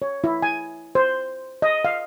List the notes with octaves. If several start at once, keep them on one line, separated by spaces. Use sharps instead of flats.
C#5
E4
G#5
C5
D#5
F5